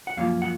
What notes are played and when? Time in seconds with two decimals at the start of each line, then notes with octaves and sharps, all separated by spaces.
0.07 F#5
0.17 F#2 F3 A#3 C#4 F4 F5
0.42 F#5